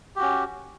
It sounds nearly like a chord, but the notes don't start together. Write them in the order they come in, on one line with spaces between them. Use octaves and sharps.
G4 F#4 C#4